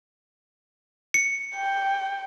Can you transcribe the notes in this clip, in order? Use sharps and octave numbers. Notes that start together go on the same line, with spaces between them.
C#7
G5